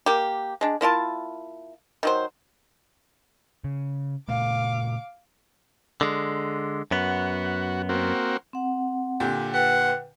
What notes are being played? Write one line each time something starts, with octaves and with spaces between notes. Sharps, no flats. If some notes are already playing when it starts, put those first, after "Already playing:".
A#3 G4
G#3 D4
A#3 E4 F4 A5
D#3 F#3 C5
C#3
A#2 C#3 A3 F5 D6
D3 G#3
F#2 B3 F#4
A#3 C4 F#4
C4 F#5
A#2 D3 G4
B4 F#5 G5